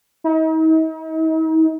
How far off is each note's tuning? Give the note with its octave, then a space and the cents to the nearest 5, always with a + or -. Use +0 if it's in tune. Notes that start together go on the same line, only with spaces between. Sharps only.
D#4 +45